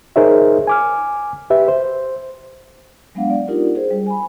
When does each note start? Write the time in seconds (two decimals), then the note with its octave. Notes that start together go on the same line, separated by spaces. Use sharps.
0.16 D#4 G#4 A#4 C5 C#5 E5
0.67 G#5 D6 F6
1.50 G4 B4 E5
1.68 C5
3.15 F#3 G#3 B3 D4 F5 F#5
3.30 D5
3.48 D4 D#4 F4 G4 A#4
3.75 G#4 C5
3.91 G3
4.07 G#5 B5